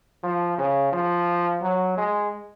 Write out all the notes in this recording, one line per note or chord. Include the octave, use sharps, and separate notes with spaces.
F3
C#3
F3
F#3
G#3